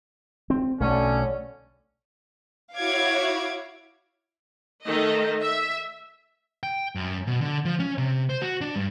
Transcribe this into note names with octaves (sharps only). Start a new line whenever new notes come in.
C4
B1 D3 A3 C#4
E4 F#4 C#5 F5 D6 G#6
D#3 A3 D#5
E5
G5
F#2
B2
D3
F3
C#4
C3
C5
F#4
D4
G2